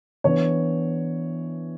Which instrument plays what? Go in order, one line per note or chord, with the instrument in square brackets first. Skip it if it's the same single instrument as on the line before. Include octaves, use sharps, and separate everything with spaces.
[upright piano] E3 B3 D4 C#5